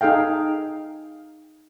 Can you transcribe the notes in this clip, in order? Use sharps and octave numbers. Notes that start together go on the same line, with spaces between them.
D#4 G#4 A4 F5 G5